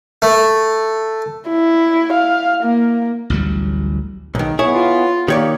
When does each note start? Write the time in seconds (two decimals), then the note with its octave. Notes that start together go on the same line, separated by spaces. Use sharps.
0.22 A3
1.49 E4
2.13 F5
2.64 A#3
3.30 A1 D2 F#3 G3
4.35 B1 G#2 D#3
4.59 B3 E4 G#4 C#5
4.75 F4
5.28 D#3 A#3 G4 C#5 D5